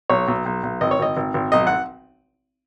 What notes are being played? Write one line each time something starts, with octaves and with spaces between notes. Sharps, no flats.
B1 C#5
B1
B1
B1
G#1 D#5
C#5
G#1 D#5
G#1
G#1
B1 D#5
F#5